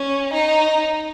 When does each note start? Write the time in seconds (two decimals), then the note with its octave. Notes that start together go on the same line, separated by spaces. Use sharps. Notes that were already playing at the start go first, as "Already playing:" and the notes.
Already playing: C#4
0.33 D#4